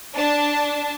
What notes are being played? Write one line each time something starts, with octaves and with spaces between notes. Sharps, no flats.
D4 A5